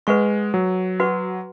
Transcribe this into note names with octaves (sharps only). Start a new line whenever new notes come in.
G#3 B4 F#5 C#6
F#3
F#4 B4 F#5 C#6